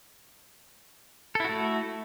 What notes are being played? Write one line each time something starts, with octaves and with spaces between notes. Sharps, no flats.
A3 E4 F#4 A4